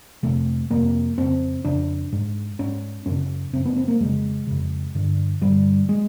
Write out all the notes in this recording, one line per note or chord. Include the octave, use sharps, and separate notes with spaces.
F2 C3 A3
F2 C3 A#3
F2 C#3 C4
F2 C#3 D4
G#2
G#2 C#4
F#2 C#3 C#4
F#2 C#3 C4
B3
C4
A#3
F2 C#3 G#3
F2 C#3
G2 D3
G2 D3 G3
G#3